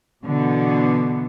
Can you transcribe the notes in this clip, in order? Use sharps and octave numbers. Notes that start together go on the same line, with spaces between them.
B2 D3 E3 B3